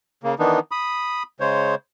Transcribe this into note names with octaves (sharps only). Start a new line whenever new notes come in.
C#3 A#3
D#3 E3 B3 D4 D#4
B5 D#6
C#3 G#3 C5 C#5